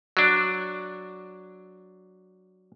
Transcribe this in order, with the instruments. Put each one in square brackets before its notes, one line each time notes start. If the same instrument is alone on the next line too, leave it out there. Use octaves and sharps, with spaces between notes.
[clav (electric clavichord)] F#3 D4